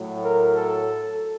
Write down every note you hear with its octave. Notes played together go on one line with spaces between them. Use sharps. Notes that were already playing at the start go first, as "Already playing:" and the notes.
Already playing: A2 F#3 A3
A#4
A4